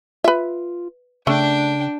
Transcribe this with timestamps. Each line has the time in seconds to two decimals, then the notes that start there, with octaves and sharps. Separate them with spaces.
0.24 F4 B4 E5
1.27 C#3 A3 D4 G5